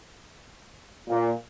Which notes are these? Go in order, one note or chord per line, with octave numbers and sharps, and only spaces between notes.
A#2